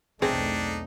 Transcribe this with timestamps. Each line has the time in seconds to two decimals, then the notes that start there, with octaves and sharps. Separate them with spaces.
0.22 B1 E2 A3 C4 D4 D#4 G#4